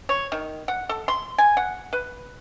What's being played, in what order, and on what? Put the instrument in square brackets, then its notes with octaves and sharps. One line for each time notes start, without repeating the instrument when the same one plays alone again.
[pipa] C#5
D#3
F#5
A4
C6
G#5
F#5
B4